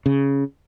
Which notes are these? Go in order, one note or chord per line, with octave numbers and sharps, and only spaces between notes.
C#3